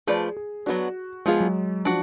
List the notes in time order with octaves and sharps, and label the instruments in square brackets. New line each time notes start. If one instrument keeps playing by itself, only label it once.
[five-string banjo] F3 A3 F4 B4 D5 [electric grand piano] G#4
[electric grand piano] G#4
[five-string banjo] F#3 B3 D4 [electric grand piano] F#4
[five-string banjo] F3 B3 F4 G#4 [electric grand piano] G#3
[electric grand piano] F#3
[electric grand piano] F3 [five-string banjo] D4 F#4